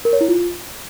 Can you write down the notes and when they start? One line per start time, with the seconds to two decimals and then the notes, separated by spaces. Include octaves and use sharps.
0.05 A#4
0.13 C#5
0.21 E4
0.28 F4